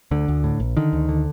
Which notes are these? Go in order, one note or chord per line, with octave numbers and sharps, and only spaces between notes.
D2 D3
D2
A2
A#1
D3 D#3
D2
D3